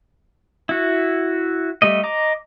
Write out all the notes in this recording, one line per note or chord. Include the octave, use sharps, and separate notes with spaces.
E4 F#4
G3 A3 D#5
D#5 A#5 D6